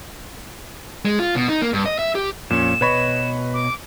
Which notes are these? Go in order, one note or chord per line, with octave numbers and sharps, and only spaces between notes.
G#3
F4
B2
D#4
A#3
G2
D#5
E5
G4
F2 A#2 C#4 E7
B2 B4 C#5 D#5 B5 C#6
D6